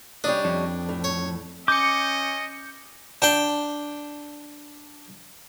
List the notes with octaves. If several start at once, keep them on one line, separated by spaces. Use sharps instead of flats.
G3 C#4 D4 D#5
F2
A2
C#5
C#4 D#5 D6 G6 C#7
D4 G5